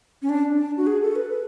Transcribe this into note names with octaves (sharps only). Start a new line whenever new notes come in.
C#4
D4
D4
F#4
G#4
A4
B4
B4